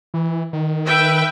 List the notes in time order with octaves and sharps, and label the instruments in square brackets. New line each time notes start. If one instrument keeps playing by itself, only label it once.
[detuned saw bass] E3
D#3
[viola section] B4 E5 G5